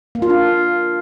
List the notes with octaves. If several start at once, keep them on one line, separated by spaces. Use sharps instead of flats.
A#3
F4
D4